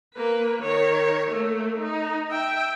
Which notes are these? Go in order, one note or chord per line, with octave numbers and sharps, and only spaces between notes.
A#3 B4
D#3 C#5
A3 A#3
D#4
E5 G5